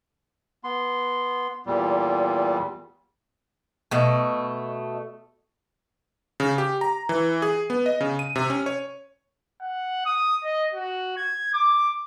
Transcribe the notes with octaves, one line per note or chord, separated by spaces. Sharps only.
B3 C6
E2 A#2 G3
B2 A3
C#3
G4
A#5
E3
G#4
B3
D#5
C#3
D#7
C3
C#4
C#5
F#5
D#6
D#5
F#4
G#6
D6